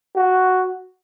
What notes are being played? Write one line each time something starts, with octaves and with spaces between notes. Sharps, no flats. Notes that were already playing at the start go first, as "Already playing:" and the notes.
F#4